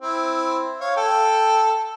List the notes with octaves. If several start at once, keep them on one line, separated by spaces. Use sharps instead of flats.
C4 E4
C#5 F5
A4 G5